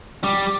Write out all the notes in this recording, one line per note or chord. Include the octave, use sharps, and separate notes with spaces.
G3